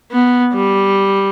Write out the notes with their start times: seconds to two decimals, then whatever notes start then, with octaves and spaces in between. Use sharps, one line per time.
0.12 B3
0.54 G3